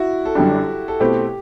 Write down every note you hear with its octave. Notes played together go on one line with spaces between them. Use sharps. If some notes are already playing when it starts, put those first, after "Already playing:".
Already playing: E4 F#4
A4
F#2 D3 G3 D4 G4
A4
B2 A3 C4 E4 G4